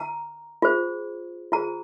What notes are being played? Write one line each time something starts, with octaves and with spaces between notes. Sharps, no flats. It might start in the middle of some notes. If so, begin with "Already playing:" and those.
Already playing: A#5
F4 G#4 C5
F4 G#4 C5 A#5